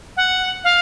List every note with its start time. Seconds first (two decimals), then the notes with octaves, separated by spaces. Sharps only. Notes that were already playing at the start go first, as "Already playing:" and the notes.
0.17 F#5
0.64 F5